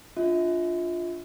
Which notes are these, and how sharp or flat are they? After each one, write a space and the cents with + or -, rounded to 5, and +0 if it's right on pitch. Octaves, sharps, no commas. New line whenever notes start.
D4 -5 F4 +0 E5 -40